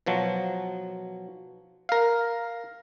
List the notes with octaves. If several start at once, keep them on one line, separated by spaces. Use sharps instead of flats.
B2 F3 F#3
A#4 F5